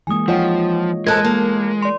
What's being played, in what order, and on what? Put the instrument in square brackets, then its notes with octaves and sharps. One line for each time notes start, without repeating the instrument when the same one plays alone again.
[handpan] E3 G#3 A#3 [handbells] G#5 D#6
[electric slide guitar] F3 [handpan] F4 C#5 D#5 [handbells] F#5 G5
[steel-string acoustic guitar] G#2 A4 [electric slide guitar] G#3 [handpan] A#4 [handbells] A5 F#6 G#6
[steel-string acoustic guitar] A#3
[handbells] D5 C6